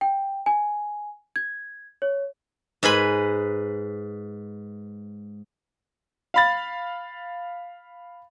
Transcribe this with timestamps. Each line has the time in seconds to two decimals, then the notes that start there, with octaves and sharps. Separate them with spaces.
0.01 G5
0.46 G#5
1.36 G#6
2.02 C#5
2.83 G#2 B4 G#5 B5
6.34 F5 B5 A6